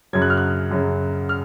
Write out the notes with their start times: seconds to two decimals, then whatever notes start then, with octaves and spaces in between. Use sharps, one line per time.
0.13 F#2 C#3 F#3 G#6
0.22 F#6
0.30 F6
0.37 F#6
0.71 F#2 C#3 F#3
1.29 F6